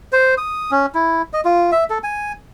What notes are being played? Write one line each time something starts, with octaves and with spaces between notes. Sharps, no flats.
C5
D#6
C#4
E4
D#5
F4
E5
A4
G#5